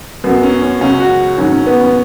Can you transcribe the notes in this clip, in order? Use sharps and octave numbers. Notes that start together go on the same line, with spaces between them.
F#2 F#3 B3
C#4
C#4
C#2 C#3 F#3 C#4
F#4
G#2 D#3 F#3 C#4
C#4
B3
C#4